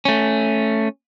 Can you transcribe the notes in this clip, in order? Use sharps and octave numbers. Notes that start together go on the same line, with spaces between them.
A3 C#4